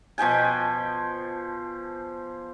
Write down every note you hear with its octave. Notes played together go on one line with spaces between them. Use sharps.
B2 F3 G5 G#5